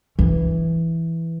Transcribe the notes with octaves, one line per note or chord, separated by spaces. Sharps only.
E3